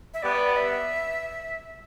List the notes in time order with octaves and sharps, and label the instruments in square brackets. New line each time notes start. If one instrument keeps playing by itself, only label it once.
[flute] E5
[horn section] G3 B3 [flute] D5
[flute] E5